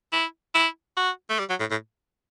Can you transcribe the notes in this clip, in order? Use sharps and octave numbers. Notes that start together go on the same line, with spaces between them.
E4
E4
F#4
A3
G3
F#3
A2
A2